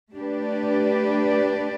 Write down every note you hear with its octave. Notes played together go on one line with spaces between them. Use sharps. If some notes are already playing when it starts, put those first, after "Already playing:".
A3 D4 G4 B4 D5